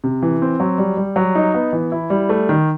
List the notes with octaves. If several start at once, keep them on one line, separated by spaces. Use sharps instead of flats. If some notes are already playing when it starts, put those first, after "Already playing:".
C3
E3
C4
F#3
G3
G3
F#3
D#4
B3
E3
E4
G3
A3
D#3